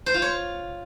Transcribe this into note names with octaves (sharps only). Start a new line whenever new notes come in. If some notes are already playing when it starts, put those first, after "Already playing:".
C5
F4
C#5